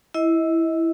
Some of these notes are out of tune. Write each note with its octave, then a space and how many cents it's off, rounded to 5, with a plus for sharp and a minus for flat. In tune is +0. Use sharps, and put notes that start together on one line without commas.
E4 +0 D#5 +35